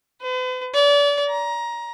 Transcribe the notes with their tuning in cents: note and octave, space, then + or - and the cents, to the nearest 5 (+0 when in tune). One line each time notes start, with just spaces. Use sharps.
B4 +45
D5 -35
A#5 +20